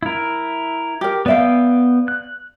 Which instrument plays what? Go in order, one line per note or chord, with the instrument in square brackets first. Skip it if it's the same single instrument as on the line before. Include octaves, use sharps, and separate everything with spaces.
[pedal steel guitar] E4 A#4
[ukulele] G4 A#4
[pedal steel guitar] B3 G5 [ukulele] D5 E5 F5
[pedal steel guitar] F#6